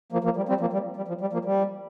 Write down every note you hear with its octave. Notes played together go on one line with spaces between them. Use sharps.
F3 A#3
F3 A#3
G3
G3 C4
F3 A#3
G3
G3
F3
G3
F3 A#3
G3